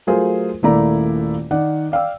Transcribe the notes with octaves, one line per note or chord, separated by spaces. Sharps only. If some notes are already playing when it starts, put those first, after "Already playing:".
F#3 A3 F4 G#4 A#4 C5
D#1 A3 A#3 E4 D5 A#5
D#3 D5 F#5
D5 F5 G5 E6